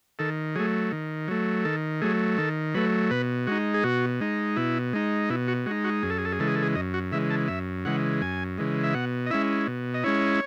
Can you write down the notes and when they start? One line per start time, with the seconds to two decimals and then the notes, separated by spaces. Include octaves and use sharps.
0.19 D#3 A4
0.56 F#3 A3 G#4
0.92 D#3
1.28 F#3 A3
1.65 D#3 A4
2.02 F#3 A3 G#4
2.38 D#3 A4
2.74 F#3 A3 B4
3.11 B2 B4
3.47 G#3 D#4 F#4
3.74 G#4
3.84 B2 F#4
4.21 G#3 D#4
4.56 B2 E4
4.93 G#3 D#4
5.30 B2 E4
5.48 F#4
5.66 G#3 F#4
5.71 D#4
5.84 F#4
6.03 F#2 G#4
6.10 A4
6.18 G#4
6.25 A4
6.32 G#4
6.39 C#3 E3 G#3 A4
6.48 G#4
6.55 A4
6.63 G#4
6.75 F#2 D#5
6.94 F#4
7.12 C#3 E3 G#3 E5
7.30 A5
7.48 F#2 E5
7.85 C#3 E3 G#3 F#5
8.22 F#2 G#5
8.58 C#3 E3 G#3
8.84 E5
8.94 B2 F#5
9.26 D#5
9.30 G#3 C#4 E4 E5
9.67 B2
9.94 D#5
10.04 G#3 C#4 E4 C#5